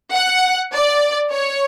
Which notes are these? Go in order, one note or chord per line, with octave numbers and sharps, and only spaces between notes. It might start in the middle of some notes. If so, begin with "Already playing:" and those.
F#5
D5
C#5